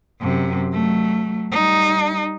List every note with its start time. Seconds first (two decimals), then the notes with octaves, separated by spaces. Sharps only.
0.21 F#2 C3
0.72 F#3 A3
1.52 G3 D#4